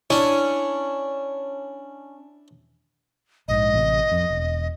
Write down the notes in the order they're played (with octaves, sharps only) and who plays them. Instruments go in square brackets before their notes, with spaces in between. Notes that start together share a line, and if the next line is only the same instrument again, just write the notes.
[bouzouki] C#4 [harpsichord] D4 E4
[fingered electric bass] A#1 G#2 [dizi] D#5
[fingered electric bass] A1 C3
F2
E1